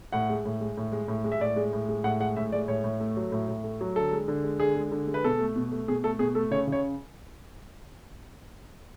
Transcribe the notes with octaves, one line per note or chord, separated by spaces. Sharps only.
A2 F#5
G#3
A2
G#3
A2
G#3
A2
G#3
E5
A2 D5
G#3
A2
G#3
A2 F#5
G#3 F#5
A2 E5
G#3 D5
A2 C#5
A2
A3
F#3
A2
A2
A3
F#3
D3 A4
G#3
D3
G#3
D3 G#4
G#3
D3
G#3
B4
B2 A4
A3
B2
A3
B2 G#4
A3 A4
B2 G#4
A3 A4
C#3 C#5
C#3
C#5